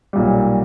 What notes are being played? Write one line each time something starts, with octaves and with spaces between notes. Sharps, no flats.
B1 A#2 G3